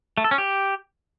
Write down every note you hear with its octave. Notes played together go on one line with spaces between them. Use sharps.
A3
A4
C#4
G4